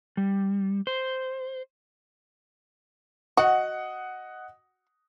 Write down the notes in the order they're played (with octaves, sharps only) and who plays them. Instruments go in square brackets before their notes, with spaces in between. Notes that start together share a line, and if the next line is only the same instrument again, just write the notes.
[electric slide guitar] G3
C5
[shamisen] F#4 [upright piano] D#5 F#5